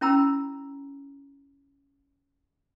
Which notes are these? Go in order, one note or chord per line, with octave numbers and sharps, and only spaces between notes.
C#4 E4 G5 A#5 B5 E6